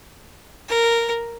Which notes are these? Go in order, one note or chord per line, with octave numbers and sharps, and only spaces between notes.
A#4